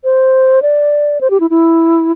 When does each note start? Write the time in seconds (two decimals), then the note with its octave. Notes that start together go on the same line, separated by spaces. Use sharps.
0.04 C5
0.62 D5
1.21 C5
1.30 G4
1.40 E4
1.50 E4